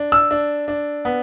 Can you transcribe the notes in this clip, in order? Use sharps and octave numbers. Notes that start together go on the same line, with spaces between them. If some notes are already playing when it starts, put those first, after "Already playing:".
Already playing: D4
E6
D4
D4
B3